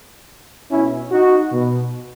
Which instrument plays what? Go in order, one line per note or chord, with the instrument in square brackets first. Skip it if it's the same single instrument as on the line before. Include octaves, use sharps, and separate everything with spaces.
[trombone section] B2 C#4 E4
D#4 F#4
B2